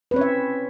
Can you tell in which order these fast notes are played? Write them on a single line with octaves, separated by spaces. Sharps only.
B4 C4 C#5 C#4 E5